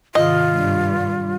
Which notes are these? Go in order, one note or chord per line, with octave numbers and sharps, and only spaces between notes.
G#2 C3 D#3 F4 D#5
G2